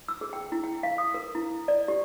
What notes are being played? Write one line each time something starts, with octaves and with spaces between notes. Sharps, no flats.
E6
G#4
G5
E4
G5
F5
D#6
A#4
E4
D5
G4